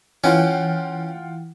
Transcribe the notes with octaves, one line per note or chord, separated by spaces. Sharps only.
E3 C#4 F4 F#5 G5